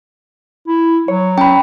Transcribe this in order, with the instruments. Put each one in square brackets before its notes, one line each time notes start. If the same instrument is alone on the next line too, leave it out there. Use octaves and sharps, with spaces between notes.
[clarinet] E4
[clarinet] F#3 [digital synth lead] C#5
[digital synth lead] C#4 [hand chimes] G5 B5